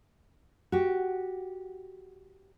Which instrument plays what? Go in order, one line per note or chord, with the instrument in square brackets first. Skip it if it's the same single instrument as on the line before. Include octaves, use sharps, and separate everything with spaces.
[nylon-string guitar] F#4 G4